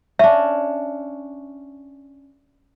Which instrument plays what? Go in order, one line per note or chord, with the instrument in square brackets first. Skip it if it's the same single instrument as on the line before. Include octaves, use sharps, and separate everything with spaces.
[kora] C#4 D4 [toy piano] E5